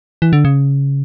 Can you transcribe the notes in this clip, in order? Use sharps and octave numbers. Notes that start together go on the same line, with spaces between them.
E3
D3
C#3